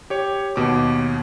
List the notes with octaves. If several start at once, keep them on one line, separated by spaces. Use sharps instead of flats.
G4 C#5
D#2 B2 D6